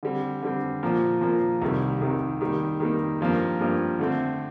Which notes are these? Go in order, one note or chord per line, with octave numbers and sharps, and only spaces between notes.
D3 G3 C4
D3 G3 C4
A#2 F3 A#3
A#2 F3 A#3
C2 C3 D#3 G3
C2 C3 D#3 G3
D#3 G3 A#3
D#3 G3 A#3
G2 F3 A#3
G2 F3 A#3
D3 A3 C4